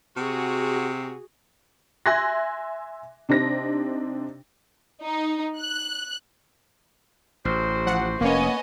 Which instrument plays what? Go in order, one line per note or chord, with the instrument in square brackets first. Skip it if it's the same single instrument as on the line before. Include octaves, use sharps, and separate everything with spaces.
[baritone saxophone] C3 [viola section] F#4 G#4
[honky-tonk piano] E5 G#5 C6 F#6 G#6 A#6
C3 D4 D#4 C5 A#6
[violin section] D#4
F#6
[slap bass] A1 [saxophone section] F#4 G4 C5
[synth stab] F3 F#5
[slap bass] F1 [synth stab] A#3 C#5 [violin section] B3 C#4 D#5